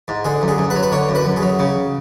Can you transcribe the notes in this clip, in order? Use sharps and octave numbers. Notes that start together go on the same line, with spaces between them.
G#2
D3 G#4
F#2
G#4
F#2
B4
F#3
B4
D3 C#5
F#2
B4
F#2
G#4
F#3
C#3